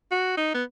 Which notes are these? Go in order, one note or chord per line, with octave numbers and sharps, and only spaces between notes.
F#4
D#4
B3